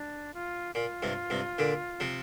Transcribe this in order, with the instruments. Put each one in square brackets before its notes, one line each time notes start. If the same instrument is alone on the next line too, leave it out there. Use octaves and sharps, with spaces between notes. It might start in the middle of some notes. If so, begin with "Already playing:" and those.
Already playing: [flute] D4
F4
[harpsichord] A#2 [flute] F4
[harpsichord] G2 C3
G2 C3
A#2 D3
C3 F3